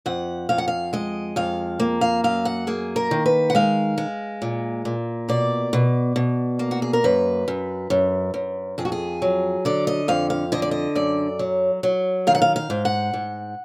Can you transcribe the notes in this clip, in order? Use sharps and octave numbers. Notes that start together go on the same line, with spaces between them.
F2 F#5
F2 F5
F#5
F5
G#3 D#5
F2 F5
A#3
F5
F#2 F5
F#5
A#3 G#4
A#4
D#3
B4
F#5
G#3 F5
G#3
A#2
A#2
B2 D5
B2
B2
A#3
F#4
G#4
A#4
F#2 B4
F#2
F#2
F#2
F2 G#4
F#4
G#4
F#3
D3 D5
D#5
F2 F5
F5
D3 D#5
D5
D#5
F#2 D5
F#3
F#3
D#3 F5
F#5
F5
F5
G#2
F#5
G#2